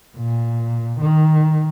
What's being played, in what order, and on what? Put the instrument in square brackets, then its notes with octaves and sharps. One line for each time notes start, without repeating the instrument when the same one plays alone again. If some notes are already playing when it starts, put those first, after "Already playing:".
[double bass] A#2
D#3